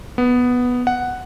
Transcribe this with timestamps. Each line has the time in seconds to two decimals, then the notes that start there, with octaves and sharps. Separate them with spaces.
0.18 B3
0.87 F#5